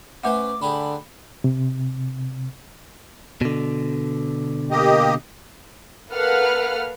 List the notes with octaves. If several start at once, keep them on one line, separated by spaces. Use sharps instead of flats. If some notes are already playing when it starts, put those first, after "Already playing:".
A3 C#4 B4 C5 E5 F#5 D6
D3 D4 G4 G#4 B5
C3
B2 D3
A#3 G4 D#5
A#3 A4 B4 F5 F#5 F6